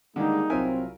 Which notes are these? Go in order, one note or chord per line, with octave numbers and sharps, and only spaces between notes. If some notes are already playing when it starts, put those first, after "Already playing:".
D3 D#3 G3 G#3 A#3 D#4 G#4
C2 F#3 C4 F4 A#4 E5 G#5